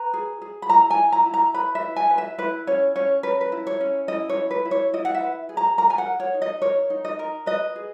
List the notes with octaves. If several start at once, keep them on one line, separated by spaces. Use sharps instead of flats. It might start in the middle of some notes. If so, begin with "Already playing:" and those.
Already playing: B4 A#5
G#4
G#4
B5
E4 A#5
G#5
E4
A#5
E4
A#5
B4 B5
E5
E4
G#5
B4
E5
E4 B4
C#4 C#5
C#4 C#5
A#4 B4
B4
E4
C#5
C#4
E4 D#5
C#5
E4
B4
E4
C#5
E4 D#5
F#5
E5
B4
G#4
A#5
A#4 A#5
G#5
F#5
A#4
C#5
D#4
D#5
A#4 C#5
D#4
D#5
A#4
B4 D#5
G#4